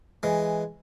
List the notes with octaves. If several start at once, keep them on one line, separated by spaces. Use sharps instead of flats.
E3 G#3